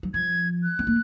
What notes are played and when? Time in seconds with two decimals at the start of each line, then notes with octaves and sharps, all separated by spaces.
0.03 F#3
0.14 F3 G#6
0.63 F#6
0.79 C4
0.87 A#3